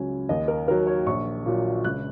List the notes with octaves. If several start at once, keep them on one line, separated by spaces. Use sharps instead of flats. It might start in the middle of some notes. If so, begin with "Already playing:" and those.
Already playing: C#2 C#3 F#3 G#5
D#2 D#5
A#4
D#3 F#3 A#4
C#5
A#1 C#6
A#2 F#3
C#2 F#6